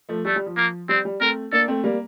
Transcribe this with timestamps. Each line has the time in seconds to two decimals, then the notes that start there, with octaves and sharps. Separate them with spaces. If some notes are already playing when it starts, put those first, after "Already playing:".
0.09 F3 A3
0.25 G3 A3
0.36 G3
0.46 F3
0.57 F3 A#3
0.89 G3 C4
1.05 G3
1.20 A3 C4 A#4
1.52 A#3 D4 A4
1.68 A3 C4
1.84 G3 A#3